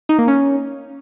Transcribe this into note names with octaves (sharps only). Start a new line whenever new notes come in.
D#4
A#3
C#4